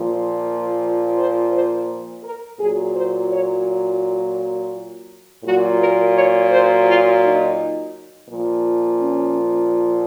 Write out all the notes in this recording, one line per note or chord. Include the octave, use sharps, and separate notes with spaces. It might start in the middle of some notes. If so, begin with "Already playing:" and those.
Already playing: A#2 F3
C5
C5
A#4
A#2 F#3 G#4
C5
C#5
A#2 F#3 F#4
A#4
C#5
C5
F4
D#4
A#2 F3
C#4